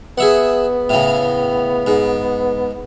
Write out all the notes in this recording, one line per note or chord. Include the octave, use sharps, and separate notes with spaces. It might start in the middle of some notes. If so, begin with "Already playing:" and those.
B3 G#4 E5 F#5
A2 C#3
G#2